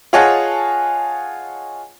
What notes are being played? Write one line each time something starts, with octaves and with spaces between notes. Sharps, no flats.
F4 G#4 C#5 D#5 F#5 A5